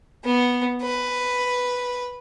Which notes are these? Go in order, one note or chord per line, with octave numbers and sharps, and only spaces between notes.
B3
B4